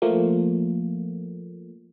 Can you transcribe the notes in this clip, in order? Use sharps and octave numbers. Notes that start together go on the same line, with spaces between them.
F3 A3 A#3